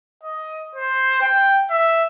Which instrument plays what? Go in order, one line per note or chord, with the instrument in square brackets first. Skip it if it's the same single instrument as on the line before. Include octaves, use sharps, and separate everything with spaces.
[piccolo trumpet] D#5
C5
G5
E5